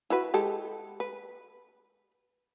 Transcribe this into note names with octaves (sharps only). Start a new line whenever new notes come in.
E4 F#4 B4
G#3 G4 A4
B4